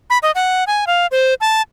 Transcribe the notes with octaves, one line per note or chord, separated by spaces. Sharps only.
B5
D#5
F#5
G#5
F5
C5
A5